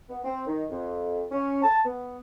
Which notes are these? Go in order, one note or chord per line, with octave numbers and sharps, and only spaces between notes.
B3
C4
D#3
F2
C#4
A5
B3